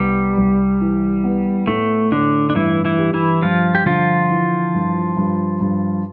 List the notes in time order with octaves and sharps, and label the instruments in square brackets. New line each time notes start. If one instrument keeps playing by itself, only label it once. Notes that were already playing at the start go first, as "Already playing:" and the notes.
Already playing: [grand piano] C2 B3 [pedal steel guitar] G3
[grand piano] C2
E3
B3
[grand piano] A2 [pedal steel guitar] A3
[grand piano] A2 [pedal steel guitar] D3 D4
[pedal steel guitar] D4
[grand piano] G2 [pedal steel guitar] E3 E4
[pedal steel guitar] E3 E4
[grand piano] G3
[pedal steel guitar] E3 E4
[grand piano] G2 [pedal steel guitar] F3 F4
[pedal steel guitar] G4
[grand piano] D3 [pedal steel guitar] F3 F4
[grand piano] E3
G2
G2
G2